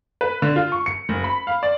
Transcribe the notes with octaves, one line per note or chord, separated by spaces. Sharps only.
B4
D3
F4
C#6
C#7
F#1
B5
F5
D5